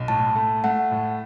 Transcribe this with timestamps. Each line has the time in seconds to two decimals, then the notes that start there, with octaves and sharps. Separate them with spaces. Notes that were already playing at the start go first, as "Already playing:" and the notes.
Already playing: B1
0.08 A2 A5
0.35 A3
0.64 A3 F#5
0.91 A2